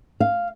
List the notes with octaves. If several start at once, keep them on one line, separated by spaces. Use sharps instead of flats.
F5